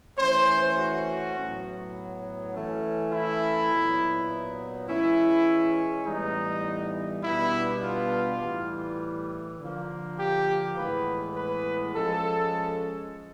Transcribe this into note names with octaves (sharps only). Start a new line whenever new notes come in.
E3 A3 C#4 C5
F#4
A2 F#3 B3
E3 A3 C#4
E4
A#2 F#3 B3 D#4
E3 G#3 C#4 E4
A2 E3 G3 B3 D#4
B2 G3 B3 D4 E4
F4
A2 E3 G3
D3 F3 A#3
G4
A2 E3 G#3 B3 B4
B4
F3 G#3 C#4 A4